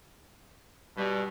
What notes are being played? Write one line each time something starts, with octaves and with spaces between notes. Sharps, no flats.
G2 B2 G3